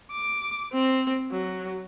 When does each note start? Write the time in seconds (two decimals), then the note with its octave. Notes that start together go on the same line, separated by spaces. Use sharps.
0.12 D6
0.73 C4
1.32 F#3